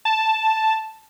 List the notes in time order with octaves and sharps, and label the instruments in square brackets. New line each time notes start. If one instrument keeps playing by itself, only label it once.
[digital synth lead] A5